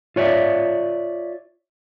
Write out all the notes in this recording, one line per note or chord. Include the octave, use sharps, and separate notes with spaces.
F4 C#5 D5 E5